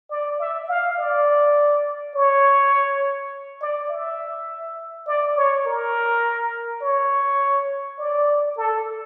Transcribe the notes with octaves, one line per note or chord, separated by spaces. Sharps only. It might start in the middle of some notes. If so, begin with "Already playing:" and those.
D5
E5
F5
D5
C#5
D5
E5
D5
C#5
A#4
C#5
D5
A4